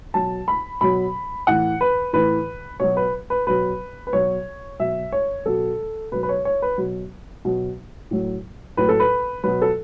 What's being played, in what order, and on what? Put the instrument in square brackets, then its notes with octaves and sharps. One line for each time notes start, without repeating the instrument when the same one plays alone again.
[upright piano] B2 F#3 A5
B5
B2 F#3 B5
A2 E3 F#5
B4
A2 E3 B4
B2 F#3 C#5
B4
B4
B2 F#3 B4
B4
B2 F#3 C#5
B2 F#3 E5
C#5
B2 F#3 A4
B2 B4
F#3
B4
C#5
C#5
B4
B2 F#3
B2 F#3
A2 F#3
A2 F#3 B4
A4
B4
B2 F#3 B4
A4